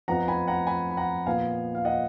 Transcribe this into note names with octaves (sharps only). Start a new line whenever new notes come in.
F2 F3 B3 F#5 A#5
G#5 B5
F#5 A#5
G#5 B5
B5
F#5 A#5
A#2 F3 B3 F5 G#5
F5
D#5 F#5